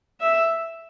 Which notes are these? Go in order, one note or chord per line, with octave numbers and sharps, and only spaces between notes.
E5